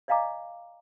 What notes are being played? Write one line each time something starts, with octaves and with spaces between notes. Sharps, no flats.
D5 D#5 F5 G#5 A#5 D6